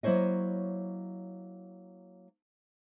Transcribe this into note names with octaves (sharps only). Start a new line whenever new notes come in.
F#3 A#3 E4 C5 C#5 D#5